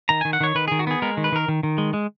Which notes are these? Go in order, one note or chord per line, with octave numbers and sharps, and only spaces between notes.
D#3 A#5
D#3 G#5
F#5
D#3 C#5
D#3 B4
D#3 G#4
F#4
B3 G#4
G#3 A#4
D#3
B4
D#3 A#4
D#3
D#3
G#3
G#3